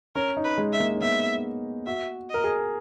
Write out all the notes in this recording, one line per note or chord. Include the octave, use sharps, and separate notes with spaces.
C#4 A#4
D#4
B4
G#3
E5
A#3
C#4
B3 E5
F#4 E5
A#4 D#5
G#4